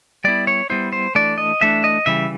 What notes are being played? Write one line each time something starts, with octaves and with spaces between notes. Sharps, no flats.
G3 B3 E4 D5
C#5
G3 B3 E4 C5
C5
E3 A3 D4 D5
D#5
E3 A3 D4 E5
D#5
C#3 E3 G3 E5